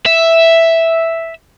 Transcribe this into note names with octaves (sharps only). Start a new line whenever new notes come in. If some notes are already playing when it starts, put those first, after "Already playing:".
E5